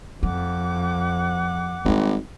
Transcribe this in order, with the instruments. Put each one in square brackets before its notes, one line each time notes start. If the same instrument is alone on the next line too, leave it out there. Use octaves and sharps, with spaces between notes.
[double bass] F2 [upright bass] F3 [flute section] F#5 D6
[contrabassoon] G#1 [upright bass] G3 D#4